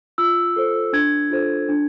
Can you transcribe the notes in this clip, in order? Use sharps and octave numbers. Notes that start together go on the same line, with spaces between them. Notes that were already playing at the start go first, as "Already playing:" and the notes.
F4 E6
A4 C5
D4 G#6
F4 A4 C5
D4